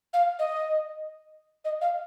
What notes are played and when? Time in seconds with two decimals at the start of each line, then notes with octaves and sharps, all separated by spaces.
0.13 F5
0.39 D#5
1.65 D#5
1.81 F5